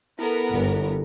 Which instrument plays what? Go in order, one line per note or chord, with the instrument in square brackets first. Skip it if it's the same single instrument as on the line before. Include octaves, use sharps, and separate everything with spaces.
[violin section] B3 A#4 [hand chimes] E4 A4
[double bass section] G1